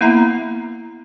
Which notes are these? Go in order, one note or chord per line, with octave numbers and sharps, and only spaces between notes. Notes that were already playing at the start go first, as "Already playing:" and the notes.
A#3 B3 E4 E5 A#5